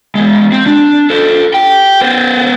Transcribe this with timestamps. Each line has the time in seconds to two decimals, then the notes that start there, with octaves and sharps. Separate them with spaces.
0.15 E2 G#3
0.52 C4
0.66 D4
1.10 A4 C5
1.54 G4 G5
2.01 B3 C5